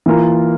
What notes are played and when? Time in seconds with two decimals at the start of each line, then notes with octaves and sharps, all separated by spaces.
0.06 E3 A#3 F4 A#4